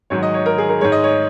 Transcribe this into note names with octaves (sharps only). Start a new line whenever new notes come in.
G#2 D#3 F#3 C#5
D#5
C#5
A#4
G#4
A#4
G#2 G#3 C#5
D#5
C#5